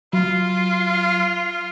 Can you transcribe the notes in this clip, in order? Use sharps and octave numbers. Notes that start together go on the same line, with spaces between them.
F#3 F4